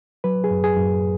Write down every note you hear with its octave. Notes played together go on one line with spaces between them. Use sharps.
F#3 B4
G#4
F#2
G#4
F#2